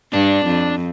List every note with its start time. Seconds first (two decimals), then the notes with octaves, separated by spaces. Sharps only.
0.13 G2 D4
0.47 F2